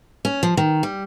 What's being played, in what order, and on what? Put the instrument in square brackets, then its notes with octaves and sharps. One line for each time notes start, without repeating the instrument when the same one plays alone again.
[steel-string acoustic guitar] C#4
F3
D#3
G3